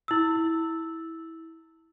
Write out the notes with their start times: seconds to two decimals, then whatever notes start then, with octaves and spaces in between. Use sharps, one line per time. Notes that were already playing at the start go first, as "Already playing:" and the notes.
0.08 E4 E6